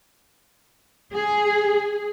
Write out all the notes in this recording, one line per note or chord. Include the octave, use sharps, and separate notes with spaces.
G#4